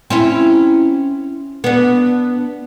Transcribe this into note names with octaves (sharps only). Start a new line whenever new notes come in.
C4 C#4 E4
B3 D4